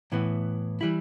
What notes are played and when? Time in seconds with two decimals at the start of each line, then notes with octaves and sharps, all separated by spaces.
0.12 A2 E3 B3
0.81 E3 G3 E4